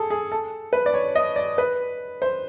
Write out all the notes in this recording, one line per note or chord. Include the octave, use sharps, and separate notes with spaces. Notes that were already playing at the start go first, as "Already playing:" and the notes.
Already playing: G#4 A4
G#4
A4
B4
D5
C#5
D#5
D5
B4
C5